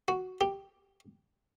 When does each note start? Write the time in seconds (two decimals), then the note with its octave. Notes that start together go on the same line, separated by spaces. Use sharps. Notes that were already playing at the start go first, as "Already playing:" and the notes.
0.08 F#4
0.41 G4